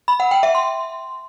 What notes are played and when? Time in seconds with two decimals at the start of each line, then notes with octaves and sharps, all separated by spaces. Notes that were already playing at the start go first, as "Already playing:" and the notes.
0.08 B5
0.20 F#5
0.31 G5
0.43 E5
0.55 C6